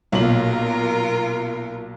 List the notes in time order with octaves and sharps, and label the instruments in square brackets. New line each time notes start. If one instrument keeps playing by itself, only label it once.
[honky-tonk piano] B1 A#2 F#7 [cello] F4 A#4